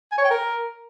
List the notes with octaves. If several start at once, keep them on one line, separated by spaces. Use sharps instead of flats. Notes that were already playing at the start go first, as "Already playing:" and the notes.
G#5
C#5
G5
A#4